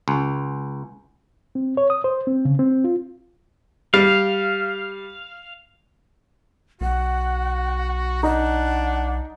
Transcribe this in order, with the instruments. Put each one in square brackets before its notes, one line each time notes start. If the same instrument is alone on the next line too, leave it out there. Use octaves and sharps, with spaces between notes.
[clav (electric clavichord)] C#2
[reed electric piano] C4
C#5
D#6
C5
C4
C#3
C4
F4
[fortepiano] G3 [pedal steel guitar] F5
[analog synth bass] B1 [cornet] F#4 [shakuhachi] F#5
[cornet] D4 [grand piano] D#4 [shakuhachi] F#5